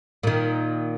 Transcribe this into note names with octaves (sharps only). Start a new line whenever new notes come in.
A#2 D#3